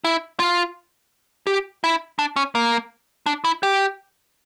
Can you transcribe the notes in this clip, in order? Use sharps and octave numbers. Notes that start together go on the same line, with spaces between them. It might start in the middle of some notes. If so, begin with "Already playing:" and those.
E4
F4
G4
E4
D4
C#4
A#3
D4
E4
G4